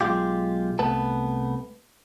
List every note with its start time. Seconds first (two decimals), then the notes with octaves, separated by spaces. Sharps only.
0.01 B1 E2 G#3 F4 G4
0.79 C2 A3 B3 B4 A5